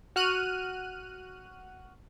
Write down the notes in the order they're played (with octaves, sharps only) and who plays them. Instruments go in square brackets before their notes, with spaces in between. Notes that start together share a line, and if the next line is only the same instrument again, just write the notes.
[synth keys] F#4 F6 F#6 D#7